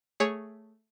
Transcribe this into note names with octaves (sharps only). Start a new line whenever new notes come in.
A3 G#4 C#5